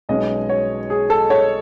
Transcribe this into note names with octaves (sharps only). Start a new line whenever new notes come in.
B1 B2 G#3 C#4 D#5
C#5
G#4
A4
C#5